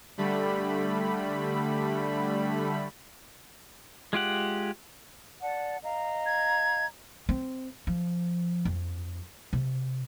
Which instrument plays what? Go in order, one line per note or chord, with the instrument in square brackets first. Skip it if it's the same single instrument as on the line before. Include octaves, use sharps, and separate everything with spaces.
[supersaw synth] D3 G3 A3 B5
[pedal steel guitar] G#3 F4 G4 F#5
[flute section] D5 F#5 A5
D#5 F5 A#5
[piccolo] G#6
[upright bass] C4
F3
F2
C3